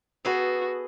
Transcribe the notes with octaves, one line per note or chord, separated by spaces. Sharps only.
B3 F#4 G#4 A4